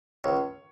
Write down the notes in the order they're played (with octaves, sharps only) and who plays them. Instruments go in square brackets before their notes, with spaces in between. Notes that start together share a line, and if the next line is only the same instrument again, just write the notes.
[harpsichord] C#2 [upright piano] C#5